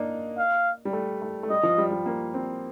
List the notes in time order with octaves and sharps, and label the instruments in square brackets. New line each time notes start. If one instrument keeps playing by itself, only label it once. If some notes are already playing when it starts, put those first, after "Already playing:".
Already playing: [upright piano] A#3 D4 D#4
[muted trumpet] F5
[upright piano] G3
A3
A3
A3
[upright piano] G3 [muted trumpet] D#5
[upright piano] F3
G3
G3
A#3
C4